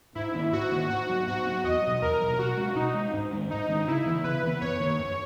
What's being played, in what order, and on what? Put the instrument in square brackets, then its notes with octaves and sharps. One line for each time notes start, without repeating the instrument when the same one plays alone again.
[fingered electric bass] G#2 [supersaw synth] E4
[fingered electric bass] D#3 A#3 C#4
[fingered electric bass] G#2 [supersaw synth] F#4
[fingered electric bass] D#3 A#3 C#4
[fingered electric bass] G#2 [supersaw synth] F#4
[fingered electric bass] F#3 B3
[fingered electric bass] G#2 [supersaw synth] F#4
[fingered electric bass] F#3 B3
[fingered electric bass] E2 [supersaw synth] D#5
[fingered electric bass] B2 F#3
[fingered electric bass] E2 [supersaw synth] A#4
[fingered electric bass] B2 F#3
[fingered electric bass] B2 [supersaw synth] F#4
[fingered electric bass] G#3 C#4
[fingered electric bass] B2 [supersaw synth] D#4
[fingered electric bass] G#3 C#4
G#2
D#3 G#3 C#4
[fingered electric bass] G#2 [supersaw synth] D#4
[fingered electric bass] D#3 G#3 C#4
[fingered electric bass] C#3 [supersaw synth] E4
[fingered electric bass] E3 B3
[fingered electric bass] C#3 [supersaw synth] B4
[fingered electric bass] E3 B3
[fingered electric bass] F#2 [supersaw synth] C#5
[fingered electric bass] D#3 A#3
F#2